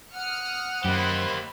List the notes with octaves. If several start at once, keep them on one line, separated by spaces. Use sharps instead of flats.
F#5 D#6 F6 C#7
F#2 A#3 G4 C5 B5